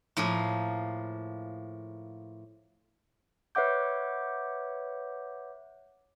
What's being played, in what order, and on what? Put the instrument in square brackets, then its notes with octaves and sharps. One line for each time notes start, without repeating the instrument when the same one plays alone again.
[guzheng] A2 F3 A#3 G#4
[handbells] B4 C#5 E5 F#5 D6 G6